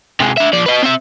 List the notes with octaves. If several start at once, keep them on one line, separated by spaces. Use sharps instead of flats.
C3 G#3
D4 E5
F3 D5
B4 D#5
C4 E5